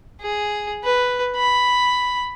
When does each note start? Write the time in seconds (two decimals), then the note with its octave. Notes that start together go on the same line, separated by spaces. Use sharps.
0.22 G#4
0.83 B4
1.36 B5